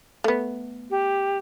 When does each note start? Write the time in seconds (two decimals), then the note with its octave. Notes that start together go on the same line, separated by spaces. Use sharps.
0.24 A3 B3
0.90 G4